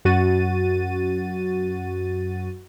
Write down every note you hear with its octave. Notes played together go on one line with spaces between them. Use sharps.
F#2 F#4 A6 D#7